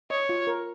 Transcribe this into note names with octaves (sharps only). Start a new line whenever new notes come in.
C#5 D#5
F4
A#4